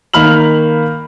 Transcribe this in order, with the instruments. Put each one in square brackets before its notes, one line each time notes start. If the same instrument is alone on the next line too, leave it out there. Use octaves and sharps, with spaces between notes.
[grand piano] D#3 A#3 B5 F6 F#7